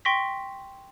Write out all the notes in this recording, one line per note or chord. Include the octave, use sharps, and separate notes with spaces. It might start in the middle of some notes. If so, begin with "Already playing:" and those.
G5 C6 C#6 A#6 B6